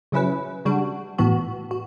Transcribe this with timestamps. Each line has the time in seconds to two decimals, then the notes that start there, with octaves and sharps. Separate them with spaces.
0.12 C#3 F#3 C#4 E4 B4
0.65 C#3 G3 D4 F#4
1.18 A2 E3 B3 F#4
1.71 F#4